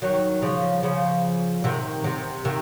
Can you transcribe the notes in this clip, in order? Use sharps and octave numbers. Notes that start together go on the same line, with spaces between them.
D#3 F#3
C#3 F3
C#3 F3
C3 D#3
C3
C3 D#3